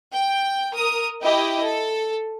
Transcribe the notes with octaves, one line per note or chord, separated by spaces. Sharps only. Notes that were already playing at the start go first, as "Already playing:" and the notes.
G5
A#4 D#6
E4 G4 D#5
A4